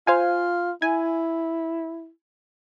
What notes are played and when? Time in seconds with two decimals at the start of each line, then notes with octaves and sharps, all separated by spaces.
0.07 F4 C5 F5 G#5
0.82 E4 G#5